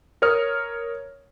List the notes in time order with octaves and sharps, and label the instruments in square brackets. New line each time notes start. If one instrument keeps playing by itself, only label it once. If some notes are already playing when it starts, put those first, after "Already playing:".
[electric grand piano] A#4 C#5 D#6 F6